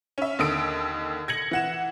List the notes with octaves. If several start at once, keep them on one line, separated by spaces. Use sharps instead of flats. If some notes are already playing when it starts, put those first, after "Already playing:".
C#4 E5
D#2 D3 D#6 D7
G#6 A#6 C#7 F#7
E3 F#5 E7